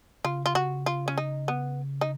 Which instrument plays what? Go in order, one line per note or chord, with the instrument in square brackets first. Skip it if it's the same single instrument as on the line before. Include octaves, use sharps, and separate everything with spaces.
[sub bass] C#3 [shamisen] F4
[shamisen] F4
F#4
F4
C#4
D#4
B3
D#4